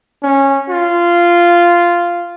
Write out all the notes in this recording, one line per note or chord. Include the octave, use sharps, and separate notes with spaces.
C#4
F4